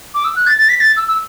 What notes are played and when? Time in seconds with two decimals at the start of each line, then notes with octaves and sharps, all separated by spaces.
0.14 D6
0.24 E6
0.36 F#6
0.47 A6
0.58 A6
0.69 B6
0.80 A6
0.97 E6
1.08 E6